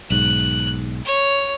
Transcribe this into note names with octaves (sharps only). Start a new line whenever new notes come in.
B1 G#2 F#6
C#5